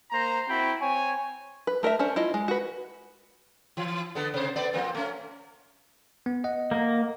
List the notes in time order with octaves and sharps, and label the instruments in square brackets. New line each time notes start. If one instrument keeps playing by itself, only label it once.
[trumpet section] A#3 C5 A#5
C4 E4 F#4 G5 B5
C4 C#5 G#5
[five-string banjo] B4
A3 A#4 C#5 E5
C#4 D4 C5
E4 F4 D#5
G#3
F#4 B4
[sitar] E3
D3 B3 A4
C3 C5
A3 B3 D5
F3 A#3 C4
A3 C#4
[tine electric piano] B3
D#5 F#5
[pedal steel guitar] A#3